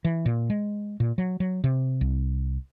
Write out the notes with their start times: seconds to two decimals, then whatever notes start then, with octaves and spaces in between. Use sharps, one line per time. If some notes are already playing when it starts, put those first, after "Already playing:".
0.05 E3
0.26 A#2
0.50 G#3
1.00 A#2
1.18 F#3
1.40 F#3
1.64 C3
2.01 C2